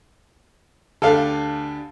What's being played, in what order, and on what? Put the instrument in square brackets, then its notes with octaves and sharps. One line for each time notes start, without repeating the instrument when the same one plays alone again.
[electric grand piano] D2 D4 G4 [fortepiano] A4 F5